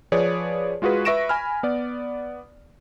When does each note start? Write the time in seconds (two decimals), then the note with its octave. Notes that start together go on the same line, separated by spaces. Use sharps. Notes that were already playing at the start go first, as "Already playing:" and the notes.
0.12 F3 G#4 B4 C#5 D5
0.82 G#3 F4 F#4 G#4 B4
1.05 B4 E5 C#6 A#6 D7 E7
1.29 G#5 B5 F6
1.63 B3 D5